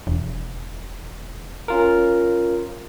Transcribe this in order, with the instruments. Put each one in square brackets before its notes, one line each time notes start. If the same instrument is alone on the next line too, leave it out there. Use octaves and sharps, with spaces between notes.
[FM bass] E1
[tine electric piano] C#4 F4 A#4